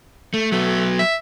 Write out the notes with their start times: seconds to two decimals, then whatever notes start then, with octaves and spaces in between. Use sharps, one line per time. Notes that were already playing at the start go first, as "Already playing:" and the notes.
0.34 A3
0.52 F#3 A3 B3
0.99 E5